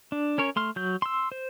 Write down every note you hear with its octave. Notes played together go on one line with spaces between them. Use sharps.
D4
C#4 A#4 C#5
A3 C6 F6
F#3 G6
C6 E6
C5